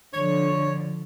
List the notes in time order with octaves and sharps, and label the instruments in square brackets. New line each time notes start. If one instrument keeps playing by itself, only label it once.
[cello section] D3 F3 [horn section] C#5